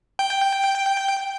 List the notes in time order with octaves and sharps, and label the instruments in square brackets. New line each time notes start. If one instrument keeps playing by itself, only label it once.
[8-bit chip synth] G5